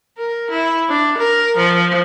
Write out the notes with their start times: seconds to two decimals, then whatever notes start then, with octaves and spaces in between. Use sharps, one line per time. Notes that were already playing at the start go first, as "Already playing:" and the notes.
0.17 A#4
0.50 E4
0.89 D4
1.17 A#4
1.56 F3